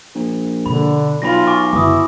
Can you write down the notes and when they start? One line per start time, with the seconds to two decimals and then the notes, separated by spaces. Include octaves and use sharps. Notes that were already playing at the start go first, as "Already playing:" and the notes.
0.15 A#1
0.66 B2 D3 B5
1.22 B1 F4 B5 A#6
1.47 G#5 C#6 D6
1.73 F#1 B2 D3 E4 D6 D#6